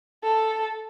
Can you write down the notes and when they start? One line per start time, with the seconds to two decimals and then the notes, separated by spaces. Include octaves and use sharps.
0.24 A4